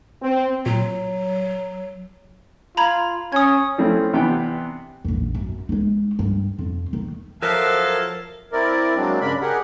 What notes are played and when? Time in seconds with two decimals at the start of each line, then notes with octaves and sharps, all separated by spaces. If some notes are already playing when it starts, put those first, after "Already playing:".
0.22 C4
0.66 A#2 F#3
2.77 F4 A#5 B5 G#6
3.32 C#4 D#6 G#6
3.78 F3 A3 C4 C#4 E4
4.13 C3 E3 B3 D4 G5
5.05 A#1 E2
5.35 F#2
5.69 G#3 D#4
6.19 G2
6.58 F2 F4
6.93 D#3
7.42 F3 F#3 A4 A#4 E5 F5 A5
8.52 C4 E4 A#4 D5
8.97 F#3 G#3 A#3 C4 D4
9.21 G2 C#3 D4 A#4 B5
9.41 G4 G#4 A#4 F#5